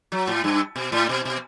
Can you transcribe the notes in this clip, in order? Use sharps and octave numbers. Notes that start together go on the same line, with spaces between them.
F#3
A2
G2
B2
A2
B2
B2